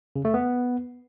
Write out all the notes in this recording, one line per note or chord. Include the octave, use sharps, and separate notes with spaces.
C#3
A3
B3